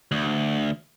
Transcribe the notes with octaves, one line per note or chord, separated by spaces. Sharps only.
D2